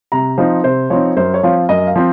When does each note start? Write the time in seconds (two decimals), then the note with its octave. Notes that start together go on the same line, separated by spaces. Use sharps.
0.12 C3 A#5
0.38 F3 C4 D#4 C5
0.64 C3 C5
0.90 F3 C4 D#4 C#5
1.17 F#2 C5
1.34 C#5
1.43 F3 C4 F4
1.69 F#2 D#5
1.87 F5
1.96 F3 C4